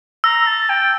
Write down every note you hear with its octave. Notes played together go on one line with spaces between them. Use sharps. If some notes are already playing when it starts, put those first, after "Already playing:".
A#5 E6
A5
G5